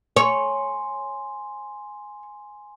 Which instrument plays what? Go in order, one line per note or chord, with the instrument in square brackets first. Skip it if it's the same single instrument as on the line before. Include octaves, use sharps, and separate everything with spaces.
[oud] C#5 [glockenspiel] G#5 C6